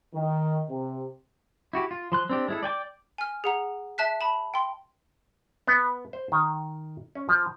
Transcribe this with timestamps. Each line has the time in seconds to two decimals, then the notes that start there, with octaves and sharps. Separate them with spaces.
0.14 D#3
0.69 C3
1.73 E4 F#4 G4
1.91 F4
2.12 F3 C6 F#6
2.29 C4 D4 G4
2.48 G#3 E4 A4
2.63 D5 G5 G#5 D6
3.18 G#5 F6
3.44 G#4 F#5 A#5
3.98 E5 A5 F#6 B6
4.21 A5 B5
4.54 G5 C6
5.67 B3
6.13 C5
6.32 D#3
7.15 C#4
7.29 F3